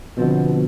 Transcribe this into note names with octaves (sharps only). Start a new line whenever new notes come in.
B2 D3 F3 C4